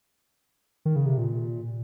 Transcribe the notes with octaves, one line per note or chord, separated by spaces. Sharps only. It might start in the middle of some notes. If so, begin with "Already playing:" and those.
D#3
C#3
C3
A#2